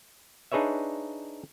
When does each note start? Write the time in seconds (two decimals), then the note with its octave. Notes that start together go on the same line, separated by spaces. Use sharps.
0.52 D4 D#4 G#4 B4 C#5 E5